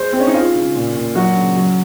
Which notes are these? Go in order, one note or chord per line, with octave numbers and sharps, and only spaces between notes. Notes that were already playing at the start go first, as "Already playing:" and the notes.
Already playing: G#3 C5
G#3 C4
C#4
D#4
G#3 F4
C#3
A#2
A#2
F#3 F#4
C#3
F#3